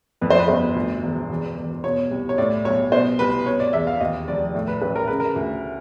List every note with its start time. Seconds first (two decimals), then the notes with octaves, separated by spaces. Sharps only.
0.21 F2 B4
0.30 C5
0.39 B4
0.48 G1 C5
0.76 D2
1.03 E1
1.30 E2
1.57 E1
1.84 B2 C#5
2.11 C2
2.29 C#5
2.38 A2 D5
2.65 B1 C#5
2.92 B2 C5
3.19 C2 B4
3.46 B2 C#5
3.60 D5
3.73 E2 E5
3.87 F5
4.00 D#2 D#5
4.28 F1 D5
4.55 A2
4.68 B4
4.81 A1 B4
4.95 A#4
5.07 C#3 B4
5.20 A#4
5.36 D2